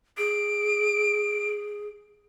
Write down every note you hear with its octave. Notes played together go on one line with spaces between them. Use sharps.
G#4 D7